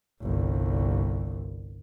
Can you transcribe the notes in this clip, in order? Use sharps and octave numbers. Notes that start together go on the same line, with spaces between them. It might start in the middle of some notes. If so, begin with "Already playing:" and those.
G1 C2